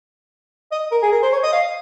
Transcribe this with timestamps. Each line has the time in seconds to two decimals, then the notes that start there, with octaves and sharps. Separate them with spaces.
0.72 D#5
0.92 A#4
1.02 G#4
1.12 A#4
1.23 C5
1.33 C#5
1.43 D#5
1.53 F5